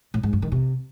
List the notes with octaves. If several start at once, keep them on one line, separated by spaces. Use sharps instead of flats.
A2
G#2
G2
D#3
C3